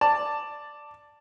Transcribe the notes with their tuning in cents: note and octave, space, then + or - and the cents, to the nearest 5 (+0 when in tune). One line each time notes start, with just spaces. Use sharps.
D5 +0 A5 +10